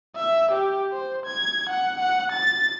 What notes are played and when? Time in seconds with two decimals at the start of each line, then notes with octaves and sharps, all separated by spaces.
0.16 E5
0.51 G4
0.92 C5
1.26 G#6
1.69 F#5
1.99 F#5
2.32 A6